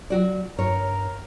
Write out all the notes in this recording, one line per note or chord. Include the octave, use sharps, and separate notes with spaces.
F#3 F#4 D5
G2 A#4 C#5